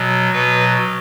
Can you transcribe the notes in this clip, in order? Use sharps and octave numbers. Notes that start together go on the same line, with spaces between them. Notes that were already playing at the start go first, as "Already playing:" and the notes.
Already playing: B2 F#3
B2 F#3 B4